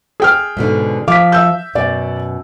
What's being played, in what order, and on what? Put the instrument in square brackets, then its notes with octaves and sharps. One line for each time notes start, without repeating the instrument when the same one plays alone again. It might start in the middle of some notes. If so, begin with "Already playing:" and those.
[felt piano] G#4 G5 F6
[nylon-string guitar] G#2 B2 D3
[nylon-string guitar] F3 F5 [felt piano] D6 B6
[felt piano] E5 E6 G6
[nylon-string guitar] F#2 B2 [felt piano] D5